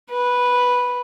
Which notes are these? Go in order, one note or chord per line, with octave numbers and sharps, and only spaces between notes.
B4